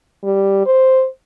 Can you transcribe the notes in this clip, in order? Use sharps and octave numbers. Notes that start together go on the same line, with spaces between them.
G3
C5